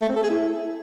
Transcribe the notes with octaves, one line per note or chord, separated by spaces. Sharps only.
A3
C4
A4
G#4
E4